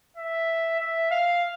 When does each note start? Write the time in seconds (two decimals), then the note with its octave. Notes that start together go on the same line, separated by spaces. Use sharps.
0.17 E5
0.80 E5
1.11 F5